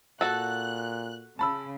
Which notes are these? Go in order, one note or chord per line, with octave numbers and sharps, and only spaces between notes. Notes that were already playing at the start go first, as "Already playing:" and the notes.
A#2 F#4 A4 F#6
C#3 A5 B5 E6